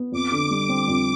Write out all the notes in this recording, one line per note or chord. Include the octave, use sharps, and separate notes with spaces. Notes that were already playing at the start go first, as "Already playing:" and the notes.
Already playing: B3
F2 D6
D3
G3 D6
C4
F2